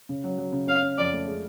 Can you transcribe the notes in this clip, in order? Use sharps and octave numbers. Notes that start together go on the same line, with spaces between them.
C#3
F#3
F#3
C#3
C#4 F5
C#4
F2 D5
A3
G#3